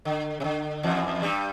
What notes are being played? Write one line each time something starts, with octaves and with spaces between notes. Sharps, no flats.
D3
C3
D3
E2 E3
G2 G3